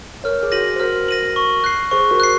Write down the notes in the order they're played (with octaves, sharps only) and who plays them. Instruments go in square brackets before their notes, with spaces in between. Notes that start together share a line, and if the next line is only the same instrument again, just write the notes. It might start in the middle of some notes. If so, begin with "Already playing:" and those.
[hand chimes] A#4 C#5 [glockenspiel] F6
[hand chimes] G#4
[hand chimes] F#4 [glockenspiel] A#6 D#7 F#7
[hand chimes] C5
[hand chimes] F#4 A#4 [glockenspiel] F6
[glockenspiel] A#6 D#7 F#7
C#6
F#6 C7
[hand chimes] G#4 C5 [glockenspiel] C#6
[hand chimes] F#4 A#4
[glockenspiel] F#6 C7